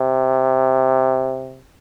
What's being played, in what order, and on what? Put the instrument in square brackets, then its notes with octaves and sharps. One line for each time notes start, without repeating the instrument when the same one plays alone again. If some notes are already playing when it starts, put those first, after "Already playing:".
Already playing: [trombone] C3